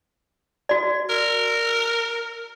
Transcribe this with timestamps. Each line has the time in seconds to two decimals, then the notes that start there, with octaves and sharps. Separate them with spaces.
0.69 F#4 D5
1.10 A#4